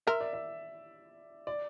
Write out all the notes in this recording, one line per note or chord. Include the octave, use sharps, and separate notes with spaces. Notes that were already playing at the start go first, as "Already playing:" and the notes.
A#4 E5
D5
E5
D5